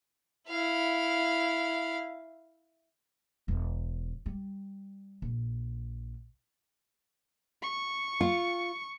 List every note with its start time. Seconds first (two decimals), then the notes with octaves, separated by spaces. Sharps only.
0.48 E4 F5
3.48 E1
4.26 G3
5.22 A#1
7.63 C#6
8.21 F4